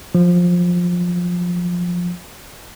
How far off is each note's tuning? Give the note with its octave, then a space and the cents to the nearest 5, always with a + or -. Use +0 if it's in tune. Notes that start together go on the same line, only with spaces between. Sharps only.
F3 +15